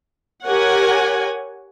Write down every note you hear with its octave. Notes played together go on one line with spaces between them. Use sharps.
G4 A#4 C#5 F#5 G#5